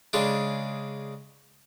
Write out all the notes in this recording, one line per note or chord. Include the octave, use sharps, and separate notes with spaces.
C#3 G#3 D4